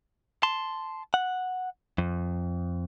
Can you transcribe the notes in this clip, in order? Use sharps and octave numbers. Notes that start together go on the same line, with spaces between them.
A5 C6
F#5
F2